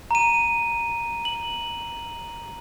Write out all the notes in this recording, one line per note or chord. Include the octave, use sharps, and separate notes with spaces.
A#5 D#7
F#7